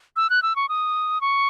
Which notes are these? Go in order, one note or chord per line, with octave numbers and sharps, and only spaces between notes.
E6
F#6
E6
C#6
D#6
C#6